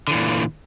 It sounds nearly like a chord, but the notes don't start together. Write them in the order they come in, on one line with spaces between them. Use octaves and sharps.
D3 E3 A#2